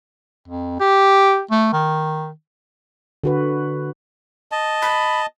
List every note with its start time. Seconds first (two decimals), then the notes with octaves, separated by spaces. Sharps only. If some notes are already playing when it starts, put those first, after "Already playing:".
0.48 F2
0.80 G4
1.51 A3
1.73 D#3
3.24 D3 F#4 B4
4.52 D#5 A5
4.82 B5